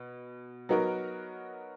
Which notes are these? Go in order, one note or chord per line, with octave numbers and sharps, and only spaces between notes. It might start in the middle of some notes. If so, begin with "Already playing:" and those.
Already playing: B2
F#3 B3 D#4 F#4 A#4